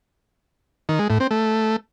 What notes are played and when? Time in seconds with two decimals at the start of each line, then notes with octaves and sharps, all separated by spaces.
0.89 D#3
0.99 G#3
1.10 A2
1.20 C4
1.31 A3